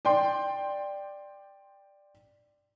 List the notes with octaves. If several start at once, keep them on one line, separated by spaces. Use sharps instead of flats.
D5 G5 C6